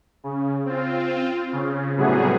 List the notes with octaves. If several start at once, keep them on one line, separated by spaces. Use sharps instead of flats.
C#3
C4 F4
C#3
A2 C3 F#3 G3 B3 G#4